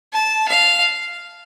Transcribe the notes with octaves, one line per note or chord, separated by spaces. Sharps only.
A5
F5